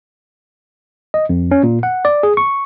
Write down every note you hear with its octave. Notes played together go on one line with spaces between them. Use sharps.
D#5
F2
C#4
A#2
F#5
D5
G#4
C#6